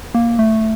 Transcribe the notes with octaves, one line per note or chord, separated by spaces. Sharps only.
A#3
A3